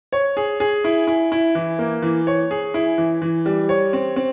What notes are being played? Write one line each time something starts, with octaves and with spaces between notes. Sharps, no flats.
C#5
G#4
G#4
E4
E4
E4
E3
A#3
E3
C#5
G#4
E4
E3
E3
G3
C#5
C4
C4